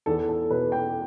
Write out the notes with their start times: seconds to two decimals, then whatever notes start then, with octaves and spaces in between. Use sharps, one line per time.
0.06 E2 A4
0.29 A4
0.50 B2 B4
0.72 G5